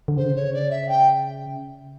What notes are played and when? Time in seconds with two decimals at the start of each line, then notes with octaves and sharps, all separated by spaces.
0.08 D3
0.16 C#3 C5
0.35 C#5
0.53 D5
0.70 E5
0.88 G5